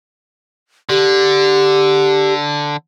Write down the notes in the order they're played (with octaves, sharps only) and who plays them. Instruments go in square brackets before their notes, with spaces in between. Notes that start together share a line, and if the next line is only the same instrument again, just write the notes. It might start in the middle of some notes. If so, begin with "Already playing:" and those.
[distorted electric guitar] D3 [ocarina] G4